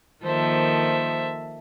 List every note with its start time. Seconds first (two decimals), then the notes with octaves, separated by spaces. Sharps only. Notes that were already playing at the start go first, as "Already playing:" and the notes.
0.24 D#3 F3 A#3 A4 C5 E5